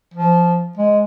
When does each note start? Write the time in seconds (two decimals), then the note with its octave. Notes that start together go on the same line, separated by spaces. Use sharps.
0.14 F3
0.77 G#3